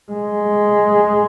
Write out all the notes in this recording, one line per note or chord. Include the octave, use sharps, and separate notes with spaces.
G#3